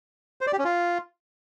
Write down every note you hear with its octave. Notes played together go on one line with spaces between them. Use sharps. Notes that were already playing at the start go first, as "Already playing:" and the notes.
C5
D5
G4
C#4
F4